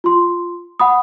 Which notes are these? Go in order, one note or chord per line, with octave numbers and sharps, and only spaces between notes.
F4 C6
F#5 B5 D#6